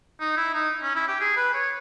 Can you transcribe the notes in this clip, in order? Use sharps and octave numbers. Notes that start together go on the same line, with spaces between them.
D#4
E4
D#4
C#4
E4
G4
G#4
B4
C#5